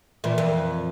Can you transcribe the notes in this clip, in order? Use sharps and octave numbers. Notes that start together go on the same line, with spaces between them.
A#2 E3 A#4 E5
F2 A#4